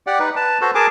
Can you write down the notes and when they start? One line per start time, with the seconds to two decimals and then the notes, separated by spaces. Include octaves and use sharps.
0.07 G4 D5 F#5
0.19 D#4 B4
0.36 B4 A5
0.61 F#4 A4 B4 C5
0.75 G#4 A#4 G#5 A5 D6